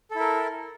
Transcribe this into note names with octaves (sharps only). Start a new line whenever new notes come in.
E4 A4 A#4